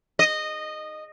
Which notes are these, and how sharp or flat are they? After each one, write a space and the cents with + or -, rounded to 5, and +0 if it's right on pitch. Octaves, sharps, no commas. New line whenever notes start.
D#5 -15